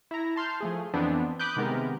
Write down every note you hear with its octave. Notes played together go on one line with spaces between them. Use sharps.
E4 A#5
A5 C6 F6 G6
F3 A3 G#4
F2 E3 B3 C4 D4
B5 D6 D#6 F#6 G6
C3 D#3 G#3 B3 G4 A#4